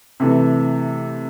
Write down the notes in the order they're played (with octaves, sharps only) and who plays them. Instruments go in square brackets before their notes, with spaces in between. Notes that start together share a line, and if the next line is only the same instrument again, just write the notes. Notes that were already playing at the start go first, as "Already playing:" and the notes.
[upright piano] C3 E3 A3